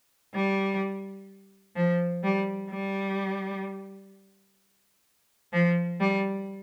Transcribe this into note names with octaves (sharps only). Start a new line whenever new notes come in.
G3
F3
G3
G3
F3
G3